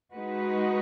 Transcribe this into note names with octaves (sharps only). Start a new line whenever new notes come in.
G#3 D#4 F#4 B4